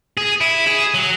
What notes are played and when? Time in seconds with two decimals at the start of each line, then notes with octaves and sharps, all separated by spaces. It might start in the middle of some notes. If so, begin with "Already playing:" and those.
0.17 G#4
0.41 E4
0.67 G#4
0.94 F#3